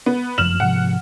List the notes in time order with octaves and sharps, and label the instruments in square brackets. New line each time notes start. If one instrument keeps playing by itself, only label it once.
[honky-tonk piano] B3
[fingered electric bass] G1 F#2 F3 [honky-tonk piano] F6 E7 F#7
[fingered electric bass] G#2 C3 F3 [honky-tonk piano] F#5